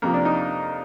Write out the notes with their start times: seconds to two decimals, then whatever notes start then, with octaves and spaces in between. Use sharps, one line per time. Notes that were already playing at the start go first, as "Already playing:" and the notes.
0.02 F2 C3 F3 A#3
0.14 D4
0.25 D#4